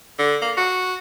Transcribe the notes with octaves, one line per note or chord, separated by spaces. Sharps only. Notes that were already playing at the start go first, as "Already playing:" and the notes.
D3
A#3
F#4